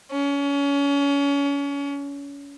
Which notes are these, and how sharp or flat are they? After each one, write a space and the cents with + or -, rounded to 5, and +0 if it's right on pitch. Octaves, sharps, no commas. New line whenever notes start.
C#4 +30